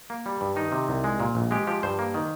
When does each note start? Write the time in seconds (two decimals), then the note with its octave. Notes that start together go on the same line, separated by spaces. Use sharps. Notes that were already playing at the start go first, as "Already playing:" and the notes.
0.10 A#3
0.26 G3
0.41 G2
0.56 D#3 D#4
0.72 C3
0.89 C2
1.04 G#3
1.20 A#2
1.35 A#1
1.51 G#3 G4
1.67 F3 G4
1.83 G2 C5
1.99 A#3
2.14 D#3